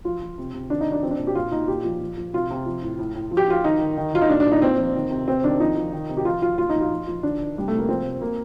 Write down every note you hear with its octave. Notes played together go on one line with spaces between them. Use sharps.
F3 F4
F3
C3
C3
D#3 D4
D#4
D#3
D4
F3 C4
D4
A#2
G4
A#2 F4
A#2 D#4
A#2 G4
F3
F3
F3
C3 F4
C3
F3
A2
A2
A2
F3
G4
F3 F4
D#3 D#4
D#3
D#3
D#3 F4
D#4
A#2 D4
D4
A#2
D#4
A#2 C4
F3
D#3
C3
C3 C4
D#3 D4
F3 D#4
F3
D#3
C3
G4
F3 F4
F3 F4
A#2 F4
D#4
F3
F4
F3
F3
D#3 D4
D#3
C3 G3
C3 A3
A#3
F3 C4
C3
C3 A#3